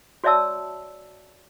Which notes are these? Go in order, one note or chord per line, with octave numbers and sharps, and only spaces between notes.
F#4 C#5 D5 E5 A5 E6